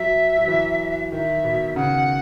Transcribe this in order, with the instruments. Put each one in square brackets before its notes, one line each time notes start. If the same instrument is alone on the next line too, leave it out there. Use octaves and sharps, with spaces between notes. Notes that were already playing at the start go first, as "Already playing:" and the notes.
Already playing: [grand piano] F#3 [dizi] E5
[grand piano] F#3
E3
[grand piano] D#3 [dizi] E5
[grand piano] B2
[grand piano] C#3 [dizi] F#5